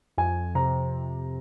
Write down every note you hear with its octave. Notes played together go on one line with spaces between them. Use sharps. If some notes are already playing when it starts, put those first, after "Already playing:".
F2 G#5
C3 A#5